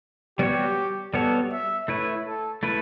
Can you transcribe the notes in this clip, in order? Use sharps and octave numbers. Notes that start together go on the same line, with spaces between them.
G3 B3 F#4 G4 C#5
G3 B3 F#4 A4 C#5
E5
A3 E4 B4 C#5
A4
A3 E4 B4